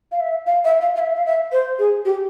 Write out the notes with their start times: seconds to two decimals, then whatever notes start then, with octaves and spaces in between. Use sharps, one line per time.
0.12 F5
0.20 E5
0.47 F5
0.65 E5
0.81 F5
0.95 F5
0.99 E5
1.16 F5
1.26 E5
1.52 C5
1.79 G#4
2.05 G4